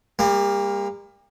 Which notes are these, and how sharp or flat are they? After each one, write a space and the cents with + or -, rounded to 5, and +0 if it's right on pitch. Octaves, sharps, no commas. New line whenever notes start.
G3 +40 A#3 +0